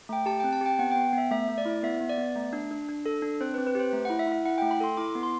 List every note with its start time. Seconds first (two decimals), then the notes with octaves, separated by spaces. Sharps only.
0.09 A3 G5
0.26 G4 A5
0.40 G5
0.44 C4
0.53 A5
0.61 G4 G5
0.79 B3 F#5
0.92 G5
0.96 B3
1.13 B3 E5
1.31 A3 E5
1.49 A3
1.58 D5
1.65 E4
1.83 B3 E5
2.01 B3
2.09 D5
2.18 B3
2.35 A3
2.53 D4
2.71 D4
2.89 D4
3.06 A4
3.22 D4
3.41 C4 C5
3.54 B4
3.58 C4
3.67 B4
3.75 G4 C5
3.93 A3
4.05 F#5
4.10 E4
4.19 E5
4.27 E4
4.32 E5
4.46 E4 F#5
4.58 G5
4.62 A3
4.71 B5
4.80 A4 C6
4.97 E4 D6
5.15 B3
5.23 C6